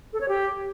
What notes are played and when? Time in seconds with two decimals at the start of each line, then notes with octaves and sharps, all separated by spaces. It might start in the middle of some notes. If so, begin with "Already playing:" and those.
0.13 A4
0.21 C#5
0.28 G4